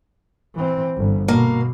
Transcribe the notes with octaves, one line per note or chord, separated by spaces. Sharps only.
E3 C4
G1
B2 A#3